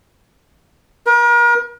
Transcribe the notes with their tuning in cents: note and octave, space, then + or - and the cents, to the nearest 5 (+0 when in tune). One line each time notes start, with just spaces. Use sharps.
A#4 +40